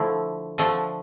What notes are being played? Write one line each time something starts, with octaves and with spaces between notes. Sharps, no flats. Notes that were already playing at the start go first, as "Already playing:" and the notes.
Already playing: D3 F3 A3 E4
D3 F3 A3